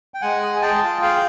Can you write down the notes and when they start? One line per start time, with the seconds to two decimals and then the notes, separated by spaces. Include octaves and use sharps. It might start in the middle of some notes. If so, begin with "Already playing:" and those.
0.14 G5
0.22 G#3 F#5 G#5
0.42 G#4
0.56 G#5
0.62 G#4 G5 A5
0.83 F4
1.02 G#4 F5 G5